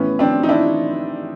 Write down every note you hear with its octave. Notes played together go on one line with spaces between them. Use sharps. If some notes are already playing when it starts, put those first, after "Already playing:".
Already playing: A2 E3 B3 C#4
C4 D4
D#4
D4 E4